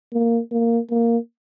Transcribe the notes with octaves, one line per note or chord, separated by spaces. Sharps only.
A#3
A#3
A#3